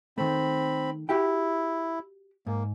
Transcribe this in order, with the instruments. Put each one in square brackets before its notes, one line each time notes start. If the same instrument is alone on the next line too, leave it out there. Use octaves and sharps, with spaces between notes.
[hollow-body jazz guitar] D#3 A3 [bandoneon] C4 B5
[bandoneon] E4 [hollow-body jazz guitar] F#4 G4 G5
[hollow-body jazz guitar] G#2 [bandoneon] A#3